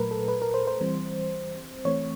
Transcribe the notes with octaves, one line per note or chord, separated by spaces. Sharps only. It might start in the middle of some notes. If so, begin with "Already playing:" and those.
Already playing: A#2 F#3 A3 A#4 B4
A4
B4
A#4
C5
C5
E3 G3 C4
E3 A3 C4 C#5